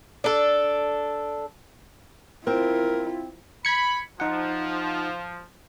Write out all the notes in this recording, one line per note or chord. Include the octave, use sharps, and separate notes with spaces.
D4 A4
C4 E4 F4 A#4
B5 G#6 C#7
F3 D#4 F#5